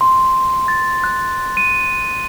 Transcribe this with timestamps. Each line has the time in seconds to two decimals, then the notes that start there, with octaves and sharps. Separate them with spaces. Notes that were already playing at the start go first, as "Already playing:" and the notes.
0.01 C6
0.68 A6
1.04 F#6
1.57 D#7